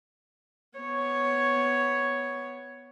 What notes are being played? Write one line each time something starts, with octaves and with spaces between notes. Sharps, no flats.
B3 C#5